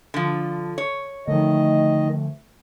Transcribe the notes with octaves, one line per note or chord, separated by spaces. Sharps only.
D3 F3
C#5
D3 D#3 F3 A3 D#5